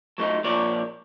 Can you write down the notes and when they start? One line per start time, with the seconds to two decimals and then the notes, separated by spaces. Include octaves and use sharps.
0.18 F#3 A3 D#4
0.44 A#2 F3 A#4 C#5 D5